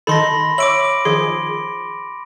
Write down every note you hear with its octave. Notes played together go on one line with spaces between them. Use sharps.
D#3 D#4 A4 B5 C6 A#6
C#5 E5 D6 D7 F#7
D#3 F3 G#4 C6